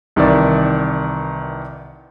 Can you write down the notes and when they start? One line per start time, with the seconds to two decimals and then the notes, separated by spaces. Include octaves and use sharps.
0.16 C2 D#3 E3 D5 E5